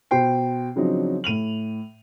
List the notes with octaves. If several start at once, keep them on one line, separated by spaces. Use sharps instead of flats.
B2 C5 G5 C7
C#3 F3 F#3 C4 D4 D#4
A2 D#7 F7 F#7